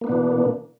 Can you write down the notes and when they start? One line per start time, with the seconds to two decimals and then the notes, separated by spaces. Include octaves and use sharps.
0.01 A#3
0.04 B3
0.07 D4
0.09 B2
0.12 E3